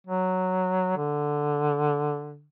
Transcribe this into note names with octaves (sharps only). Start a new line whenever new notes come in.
F#3
D3